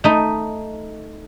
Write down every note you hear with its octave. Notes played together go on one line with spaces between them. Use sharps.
A3 D#4